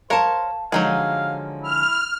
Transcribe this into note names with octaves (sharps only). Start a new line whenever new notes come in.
A#4 C5 C#5 F5 A5
D3 F3 F#3 G#3 D#4 G#4 F5
E4 F6